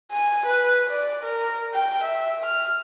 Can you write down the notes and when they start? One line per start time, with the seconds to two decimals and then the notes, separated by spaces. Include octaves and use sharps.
0.12 G#5
0.46 B4
0.90 D5
1.24 A#4
1.75 G5
2.04 E5
2.46 F6